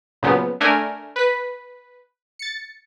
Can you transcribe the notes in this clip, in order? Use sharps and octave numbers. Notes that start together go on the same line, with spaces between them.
A#2 C#3 F3 F#3 B3
A3 D4 A#4 G#5
B4 B6
A6 C#7